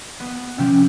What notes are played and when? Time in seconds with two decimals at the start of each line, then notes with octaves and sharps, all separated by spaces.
0.20 B3
0.58 C3 F3 C#4 G4